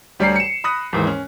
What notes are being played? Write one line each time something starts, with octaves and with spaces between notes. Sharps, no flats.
D2 G3 C#5 D5 A#5 C7
C#7 E7
B5 D#6 F#6 A#6
D#2 G#2 E3
C#4